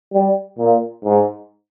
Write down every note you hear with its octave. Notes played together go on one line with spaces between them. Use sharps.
G3
A#2
G#2